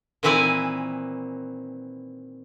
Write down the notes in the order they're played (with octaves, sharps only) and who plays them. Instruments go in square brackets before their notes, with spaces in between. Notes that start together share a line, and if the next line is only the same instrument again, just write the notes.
[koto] A#2 D#3 E3 C4 B4 G#5